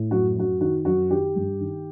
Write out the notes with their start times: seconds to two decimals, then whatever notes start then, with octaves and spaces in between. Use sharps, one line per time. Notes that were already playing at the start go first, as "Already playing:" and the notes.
Already playing: A2
0.11 F#2 F#4
0.36 F#2 F#4
0.61 D#3 F#4
0.85 F#2 F#4
1.11 D#3 G4
1.36 G2
1.60 D#3